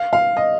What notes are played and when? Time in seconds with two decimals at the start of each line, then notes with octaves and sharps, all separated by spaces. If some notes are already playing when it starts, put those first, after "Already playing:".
Already playing: F5
0.13 F5
0.37 D#5